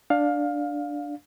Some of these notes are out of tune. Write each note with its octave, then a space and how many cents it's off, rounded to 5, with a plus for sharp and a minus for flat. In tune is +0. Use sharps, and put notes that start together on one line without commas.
D4 +0 F5 +15